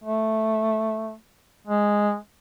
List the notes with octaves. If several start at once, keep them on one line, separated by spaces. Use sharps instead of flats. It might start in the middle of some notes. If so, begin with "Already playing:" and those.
A3
G#3